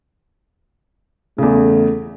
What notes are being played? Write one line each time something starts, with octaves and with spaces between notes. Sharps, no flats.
E2 C#3 A3